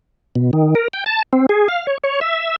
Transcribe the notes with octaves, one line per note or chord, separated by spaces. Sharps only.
B2
D#3
A#4
G5
A5
C4
G#4
F5
C#5
C#5
E5